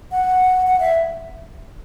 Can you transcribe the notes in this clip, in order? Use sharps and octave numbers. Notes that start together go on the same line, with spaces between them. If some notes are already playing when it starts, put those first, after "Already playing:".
F#5
F#5
E5